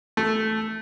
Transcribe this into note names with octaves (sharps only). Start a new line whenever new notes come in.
A3